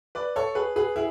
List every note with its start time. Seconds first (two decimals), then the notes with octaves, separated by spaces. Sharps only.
0.15 B4 D5
0.36 A4 C#5
0.55 G#4 B4
0.76 G#4 B4
0.96 E4 G#4